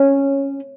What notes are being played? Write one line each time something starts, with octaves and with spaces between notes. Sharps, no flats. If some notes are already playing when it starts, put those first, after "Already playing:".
Already playing: C#4